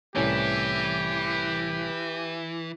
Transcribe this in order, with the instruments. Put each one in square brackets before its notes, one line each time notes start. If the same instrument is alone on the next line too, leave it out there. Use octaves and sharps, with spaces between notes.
[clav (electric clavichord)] C2 A2 C#4 [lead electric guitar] E3 [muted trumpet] G4